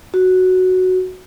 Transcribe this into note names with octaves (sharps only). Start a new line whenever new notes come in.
F#4